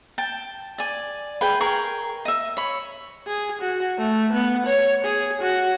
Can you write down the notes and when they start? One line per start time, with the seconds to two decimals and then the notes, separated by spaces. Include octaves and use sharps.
0.18 G5 A5
0.78 D5 G#5
1.41 G#4 B4 G5
1.60 G#4 A#4 G5 C#6
2.25 D#5 E5
2.57 C#5 B5
3.27 G#4
3.61 F#4
3.98 A3
4.33 B3
4.66 C#5
5.05 G#4
5.41 F#4